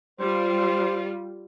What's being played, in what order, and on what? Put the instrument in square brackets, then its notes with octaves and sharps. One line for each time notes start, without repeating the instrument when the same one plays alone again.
[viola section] G3 F4 [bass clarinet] C5